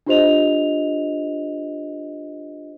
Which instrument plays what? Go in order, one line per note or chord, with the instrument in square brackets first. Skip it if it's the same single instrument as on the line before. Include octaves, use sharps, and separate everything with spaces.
[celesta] D4 F4 G4 C5 D#5 F7